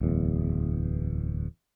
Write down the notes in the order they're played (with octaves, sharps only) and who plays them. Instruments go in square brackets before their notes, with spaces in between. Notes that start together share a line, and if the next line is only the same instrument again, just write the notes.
[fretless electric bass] D1 E2